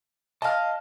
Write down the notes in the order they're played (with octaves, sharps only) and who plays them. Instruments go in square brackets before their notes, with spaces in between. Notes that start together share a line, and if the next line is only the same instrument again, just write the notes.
[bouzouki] D#5 F5 [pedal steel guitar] A5 F6